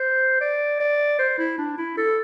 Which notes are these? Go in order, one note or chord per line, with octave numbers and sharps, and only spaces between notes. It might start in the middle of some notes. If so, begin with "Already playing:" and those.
Already playing: C5
D5
D5
C5
E4
D4
E4
A4